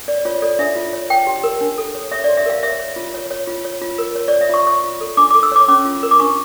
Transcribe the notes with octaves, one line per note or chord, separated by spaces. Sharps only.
C#5 D5
F4 C#5
A4 D5
D4 E5
F4
C#5
C#5 G5
G4
A#4
D4
A4
C#5
C#5 E5
D5
G4
E5
A#4 F5
C#5 E5
C#5
F4
C#5
C#5
F4
C#5
F4
A#4
C#5
D5
C#5
E5
F4 C#6
C#5 C#6
F4
A4
D4 D6
D6
A4
E6
C#5 D6
C#4 D6
F4
A#4
D6
D4 C#6